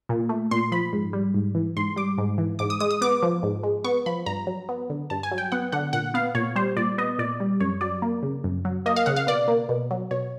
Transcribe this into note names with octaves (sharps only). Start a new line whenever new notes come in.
A#2
A3
A#2 C6
F3 B5
G#2
G3
G#2
E3
G#2 C6
G3 D6
G#2
E3
G#2 D6
D#6
G#3 D#6
D#6
B3 D6
F3
G#2
G#3
B3 C#6
F3 B5
G2 A#5
F#3
B3
D3
G2 A5
G#5
F#3
G5
B3 F#5
D3 F#5
A#2 F#5
B3 F5
A#2 C#5
G3 C5
A#2 D5
B3 D#5
A#2 D5
G3
F#2 C#5
F#3 D5
A#3
C#3
F#2
F#3
A#3 D#5
F5
C#3 F#5
F5
B2 D5
A#3
B2
F#3
B2 C#5